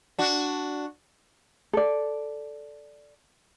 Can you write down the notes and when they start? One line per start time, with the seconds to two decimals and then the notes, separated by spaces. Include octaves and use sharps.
0.19 D4 F#4
1.73 A4 D5